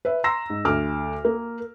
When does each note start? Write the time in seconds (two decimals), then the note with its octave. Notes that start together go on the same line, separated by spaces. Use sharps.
0.05 B4 E5
0.24 A#5 C6 E6 A#6
0.50 G#2
0.65 D2 D6 F6
1.25 A#3